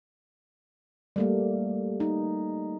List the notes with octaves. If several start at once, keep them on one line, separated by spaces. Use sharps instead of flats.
G3 A3 A#3
D#4